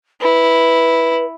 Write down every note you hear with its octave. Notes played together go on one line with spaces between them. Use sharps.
E4 B4